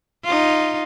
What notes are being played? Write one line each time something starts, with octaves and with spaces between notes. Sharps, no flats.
D#4 F4